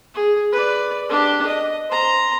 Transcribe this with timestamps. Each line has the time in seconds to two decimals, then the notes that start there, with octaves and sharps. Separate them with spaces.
0.14 G#4
0.52 B4 D5
1.09 D4 G4
1.47 D#5
1.90 C5 A#5